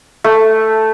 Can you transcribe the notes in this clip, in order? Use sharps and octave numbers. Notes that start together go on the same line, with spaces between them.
A3